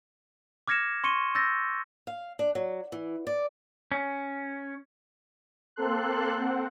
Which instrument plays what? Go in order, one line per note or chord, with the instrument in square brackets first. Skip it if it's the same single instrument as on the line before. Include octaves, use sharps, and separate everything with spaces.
[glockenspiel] D6 F6 G#6 A#6 C#7 E7
C6 C#6 C#7 D#7 G7
E6 G6 A6 A#6
[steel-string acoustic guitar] F5
D4
F#3
E3
D5
[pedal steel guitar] C#4
[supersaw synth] A#3 C4 A4 C6 F#6
C4 F#5